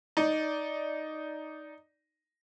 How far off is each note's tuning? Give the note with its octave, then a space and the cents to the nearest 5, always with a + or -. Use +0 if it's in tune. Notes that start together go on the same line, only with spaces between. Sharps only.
D#4 +0 D5 -10